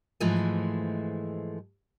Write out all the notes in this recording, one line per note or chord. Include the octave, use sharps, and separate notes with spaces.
G#2 E3 F3 G#3 A3